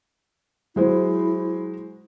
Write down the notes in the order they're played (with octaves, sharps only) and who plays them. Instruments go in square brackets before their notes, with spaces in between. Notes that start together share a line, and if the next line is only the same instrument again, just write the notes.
[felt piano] F#3 G#3 C5 [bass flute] E4